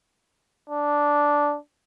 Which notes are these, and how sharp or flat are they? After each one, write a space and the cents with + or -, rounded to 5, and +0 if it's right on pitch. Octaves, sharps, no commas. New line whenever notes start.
D4 -5